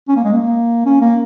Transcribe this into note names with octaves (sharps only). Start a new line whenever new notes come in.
C#4
A#3
G#3
A#3
C#4
A#3